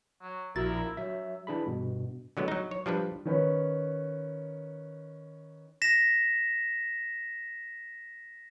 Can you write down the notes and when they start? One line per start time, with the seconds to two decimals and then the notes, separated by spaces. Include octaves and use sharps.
0.22 F#3
0.56 A#1 E4 F#4 A#4 A6
0.97 F#3 E5
1.47 E3 D4 G#4 B5
1.66 G2 B2
2.37 D3 F#3 G#3 B3
2.48 F#3 D#4
2.71 C#5
2.86 F3 G3 D4 B4
3.25 D#3 C#4 B4
5.82 A#6 B6 E7